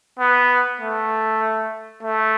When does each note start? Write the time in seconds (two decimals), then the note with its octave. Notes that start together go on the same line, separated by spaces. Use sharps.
0.19 B3
0.80 A3
2.03 A3